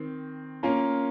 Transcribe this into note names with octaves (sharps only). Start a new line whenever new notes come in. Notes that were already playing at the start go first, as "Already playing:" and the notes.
Already playing: D#3 C4
A#3 C#4 F4 A#4